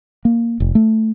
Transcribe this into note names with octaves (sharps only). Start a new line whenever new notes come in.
A#3
F1
A3